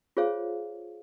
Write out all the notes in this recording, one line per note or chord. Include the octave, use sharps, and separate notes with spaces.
F4 G#4 C5 C#5 F5